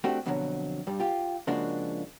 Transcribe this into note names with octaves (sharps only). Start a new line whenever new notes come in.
A3 C4 D4 F#4 G4
F2 B2 D3 E3 F#3
G2 G3
F4 G4
C#3 F3 G#3 A#3 D4 F#4